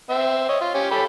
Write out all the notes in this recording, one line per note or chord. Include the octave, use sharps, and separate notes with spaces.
C4 E5
C#5 D#5
F4
C#4 G4
G4 A4 B5